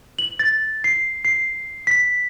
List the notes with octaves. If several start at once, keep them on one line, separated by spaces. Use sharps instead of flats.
F#7
A6
C7
C7
B6